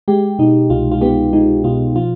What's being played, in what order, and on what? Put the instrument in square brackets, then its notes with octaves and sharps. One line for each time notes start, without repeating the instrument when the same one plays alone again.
[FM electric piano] G#3 G4
B2 D#4
C2 F4
F4
B3 G4
G#3 D#4
B2 F4
F3 F4